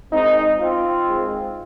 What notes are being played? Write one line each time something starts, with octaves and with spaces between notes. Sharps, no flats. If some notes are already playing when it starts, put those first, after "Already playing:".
G#1 G#2 G#3 C4 D#4
C4 F4
G#1 G#2 G#3